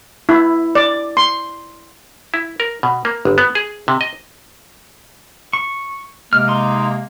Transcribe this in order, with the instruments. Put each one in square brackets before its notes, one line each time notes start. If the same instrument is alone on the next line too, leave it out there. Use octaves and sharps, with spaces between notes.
[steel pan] E4
D5
C6
[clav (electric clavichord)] E4
A#4
B2
A#3
G1
B3
G#4
C3
D#5
[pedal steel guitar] C#6
[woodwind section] C3 G#3 A#3 [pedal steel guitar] F6
[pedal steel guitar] D#4 C6